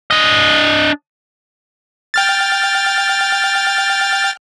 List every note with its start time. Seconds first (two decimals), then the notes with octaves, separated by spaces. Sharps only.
0.11 D4 D#5
2.14 G5 F6 A6